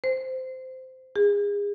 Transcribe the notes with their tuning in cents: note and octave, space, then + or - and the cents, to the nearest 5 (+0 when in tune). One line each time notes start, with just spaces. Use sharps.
C5 -15
G#4 -30